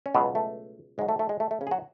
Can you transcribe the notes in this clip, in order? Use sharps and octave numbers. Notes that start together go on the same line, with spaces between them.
C#4
C#2 B2 F#3 B3
A3
G#2 F#3 G#3
A3
A3
G#3
A3
A3
C#3 C#4
G#4
F#3 F#4